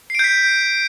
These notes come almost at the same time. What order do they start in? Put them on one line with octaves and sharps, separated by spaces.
C7 D7 G6 B6